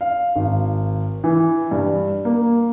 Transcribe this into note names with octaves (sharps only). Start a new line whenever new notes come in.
F5
G#1
E3
G2
A#3